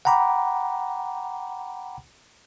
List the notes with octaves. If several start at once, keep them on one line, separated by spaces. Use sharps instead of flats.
F#5 G5 A#5 B5 D6